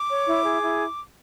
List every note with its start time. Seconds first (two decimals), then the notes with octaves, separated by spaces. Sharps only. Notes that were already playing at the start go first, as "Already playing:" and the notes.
Already playing: D6
0.10 C#5
0.28 E4
0.45 G#4
0.62 E4